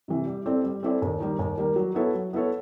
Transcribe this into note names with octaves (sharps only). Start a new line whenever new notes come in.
C3 E3
G3
C4 E4 A4 D5
G3
C4 E4 A4 D5
D#2
D#3 G3 A#3
D#2
D#3 G3 A#3
F#3
B3 E4 A4 C#5
F#3
B3 E4 A4 C#5